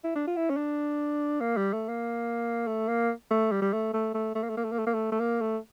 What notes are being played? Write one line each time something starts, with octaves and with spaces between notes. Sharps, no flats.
E4
D4
F4
E4
C#4
D4
A#3
G3
A3
A#3
A3
A#3
A3
G3
G3
A3
A3
A3
A3
A#3
A3
A#3
A3
A#3
A3
A#3
A3
A3
A#3
A3